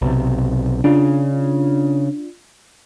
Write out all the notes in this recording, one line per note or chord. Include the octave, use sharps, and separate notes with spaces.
B1 C3
C#3 D4 F4